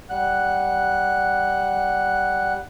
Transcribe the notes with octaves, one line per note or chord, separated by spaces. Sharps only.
G3 F#5 F#6